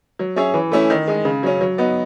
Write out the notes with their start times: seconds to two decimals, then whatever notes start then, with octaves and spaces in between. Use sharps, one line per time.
0.19 F#3
0.36 C#4 G#4 C#5 E5
0.54 E3
0.72 A3 C#4 E4
0.90 D#3
1.07 G#3 D#4
1.25 C#3
1.43 F#3 C#4
1.61 F#3
1.78 B3 D#4 F#4